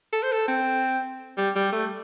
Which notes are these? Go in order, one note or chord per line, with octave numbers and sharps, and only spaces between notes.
A4
C5
A4
C4
G3
G3
A3